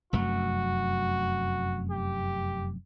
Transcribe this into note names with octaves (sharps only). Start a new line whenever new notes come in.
F1 F#2 A3 F#4
G4